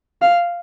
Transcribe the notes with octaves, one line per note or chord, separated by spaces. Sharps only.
F5